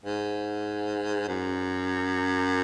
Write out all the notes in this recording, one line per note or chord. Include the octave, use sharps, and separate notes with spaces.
G#2
F#2